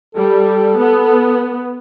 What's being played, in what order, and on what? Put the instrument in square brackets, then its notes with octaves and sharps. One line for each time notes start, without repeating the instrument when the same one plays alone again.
[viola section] G3 [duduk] A4
[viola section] B3